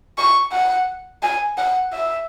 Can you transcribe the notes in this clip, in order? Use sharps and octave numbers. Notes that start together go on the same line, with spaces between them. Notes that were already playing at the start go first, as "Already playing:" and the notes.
C#6
F#5
G#5
F#5
E5